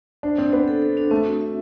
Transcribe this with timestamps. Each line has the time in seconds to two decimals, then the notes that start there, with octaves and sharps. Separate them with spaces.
0.23 D4 C5
0.38 C4 D4
0.52 B3 C5
0.68 A4
0.82 A4
0.97 D4
1.11 A3 C4
1.26 F#4
1.41 E5